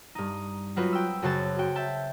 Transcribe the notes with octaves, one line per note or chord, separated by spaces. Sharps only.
G2 D#4
F#3 C4 D#4 F4 F#4 B4
G5 E6
F#2 C#3 F#4 C5 C#5 A5
F#4 G5
E5 A5 G6